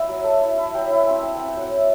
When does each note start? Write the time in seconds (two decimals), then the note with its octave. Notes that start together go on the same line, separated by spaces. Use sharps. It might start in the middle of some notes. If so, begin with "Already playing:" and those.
Already playing: E4 E5 F#5
0.08 F#3
0.24 A3
0.41 E4
0.58 E4
0.74 F#3 G5
0.86 E4 E5
0.98 F#5
1.07 C4 G5
1.22 C4 G5
1.35 C4 F#5
1.48 G5
1.56 F#3 F#5
1.72 E4